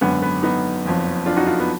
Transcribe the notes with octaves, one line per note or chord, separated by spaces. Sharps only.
G#1 F#2 D3 B3
B3
B3 D#4
F#1 F2 F3
D4 F4
D#4 F#4
D4 F4
B3